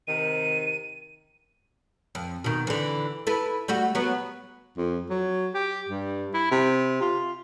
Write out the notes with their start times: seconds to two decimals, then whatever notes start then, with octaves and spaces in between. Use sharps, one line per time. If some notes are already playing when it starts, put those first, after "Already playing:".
0.07 C3 D#3 D#7
2.15 F2
2.44 B2 D#3
2.67 D3 E3
3.27 E4 A4 B4
3.68 G3 A3 F#4
3.95 F#3 B3
4.78 F2
5.10 F#3
5.54 G4
5.89 G2
6.34 E4
6.51 C3
7.01 F4